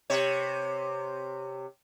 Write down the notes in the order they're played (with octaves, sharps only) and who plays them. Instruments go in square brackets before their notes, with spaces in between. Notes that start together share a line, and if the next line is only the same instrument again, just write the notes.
[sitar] C3 C#5